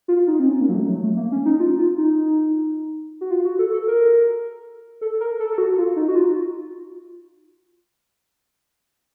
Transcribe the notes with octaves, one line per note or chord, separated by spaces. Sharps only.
F4
D#4
C4
C#4
A#3
F#3
A3
F#3
A3
A#3
C#4
D#4
F4
F4
D#4
F#4
F4
F#4
A4
A4
A#4
A4
A#4
A4
A4
F#4
F4
D#4
F#4
F4